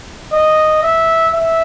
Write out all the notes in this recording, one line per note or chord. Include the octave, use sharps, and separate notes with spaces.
D#5
E5
E5